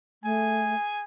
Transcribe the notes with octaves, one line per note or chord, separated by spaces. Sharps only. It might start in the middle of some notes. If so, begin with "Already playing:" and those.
A3 G#4 G#5